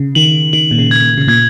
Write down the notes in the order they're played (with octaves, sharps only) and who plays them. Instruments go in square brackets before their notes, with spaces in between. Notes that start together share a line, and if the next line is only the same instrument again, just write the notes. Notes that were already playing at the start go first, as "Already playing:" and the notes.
Already playing: [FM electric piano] C#3
[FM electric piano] D#3 [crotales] F#7
[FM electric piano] D#3 [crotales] F#7
[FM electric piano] A#2
C#3
[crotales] G#6
[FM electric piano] A#2
C#3
[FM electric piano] A#2 [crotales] G#6